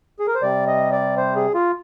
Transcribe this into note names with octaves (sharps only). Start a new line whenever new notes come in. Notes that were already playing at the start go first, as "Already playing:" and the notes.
G#4
A#4
C5
C3 G3 D5
D#5
D5
C5
G#4
F4